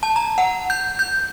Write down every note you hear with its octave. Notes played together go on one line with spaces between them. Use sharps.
A5
A#5
F#5
G6
G6